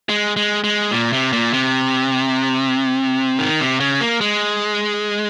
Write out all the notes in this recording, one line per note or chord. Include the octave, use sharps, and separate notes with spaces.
G#3
G#3
G#3
A#2
C3
A#2
C3
D#3
C3
C#3
A#3
G#3